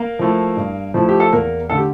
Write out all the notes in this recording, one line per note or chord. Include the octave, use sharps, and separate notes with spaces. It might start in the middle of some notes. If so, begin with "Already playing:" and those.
Already playing: A#3 A#4
F3 A3 E4
G2
F3 A3 E4
G4
A4
E2 A#3 A#4
D3 A3 A4
G4